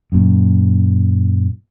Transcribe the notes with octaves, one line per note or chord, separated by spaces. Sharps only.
F#2 A#2